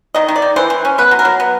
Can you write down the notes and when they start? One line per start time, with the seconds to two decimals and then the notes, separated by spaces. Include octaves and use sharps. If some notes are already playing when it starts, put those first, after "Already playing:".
0.15 D#3 D#5
0.28 D#3
0.36 D5
0.42 D#3
0.56 E3 C5
0.70 E3
0.85 C#4
0.98 B3 B4
1.11 F#3
1.19 A#4
1.25 F#3
1.40 B3